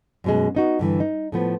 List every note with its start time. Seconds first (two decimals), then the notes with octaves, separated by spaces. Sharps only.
0.24 F#2 B2 G#3
0.55 B3 D#4 F#4
0.79 G2 D3 E3
1.00 D#4
1.32 A2 F3 B3